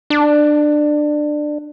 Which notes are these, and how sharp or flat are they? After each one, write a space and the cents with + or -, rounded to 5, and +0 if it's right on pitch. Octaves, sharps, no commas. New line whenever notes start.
D4 +20